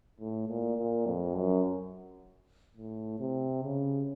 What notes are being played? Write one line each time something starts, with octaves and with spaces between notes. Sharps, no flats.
A2
A#2
A#2
F2
F#2
A2
C3
C#3